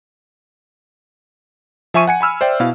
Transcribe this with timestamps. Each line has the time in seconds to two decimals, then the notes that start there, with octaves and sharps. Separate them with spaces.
1.94 F3 E5 G#5 C#6 D#7
2.07 F#5 G#5 C#7
2.21 G#5 B5 E6 F6
2.41 C5 D5 E5 G5
2.60 B2 E4 F5